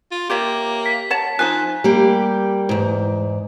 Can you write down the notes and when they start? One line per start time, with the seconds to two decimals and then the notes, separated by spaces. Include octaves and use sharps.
0.11 F4
0.30 A#3 G4 C#5 E5
0.86 B6
1.10 C#5 F#5 A5
1.39 F3 D#4 G#4 G#5 F#6
1.84 G3 A#3 G4
2.69 E2 G#2